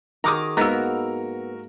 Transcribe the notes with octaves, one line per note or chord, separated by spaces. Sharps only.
D#3 F#4 G#4 A#5 D6 D#6
G#2 A#3 B3 F#4 A#4 A#5 E6